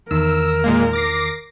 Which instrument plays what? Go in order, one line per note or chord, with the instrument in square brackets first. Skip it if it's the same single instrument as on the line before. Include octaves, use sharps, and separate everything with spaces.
[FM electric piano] E2 D#3 [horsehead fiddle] A#4 [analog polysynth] E6
[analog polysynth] A#2 G#3 A#3
D6 A#6 C7